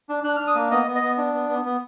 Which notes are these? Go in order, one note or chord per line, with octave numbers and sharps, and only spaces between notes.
D4
D4 F#6
F6
D4
D#6
A#3
B3 D#5
B3
D#5
B3
D4
B3
B3
B3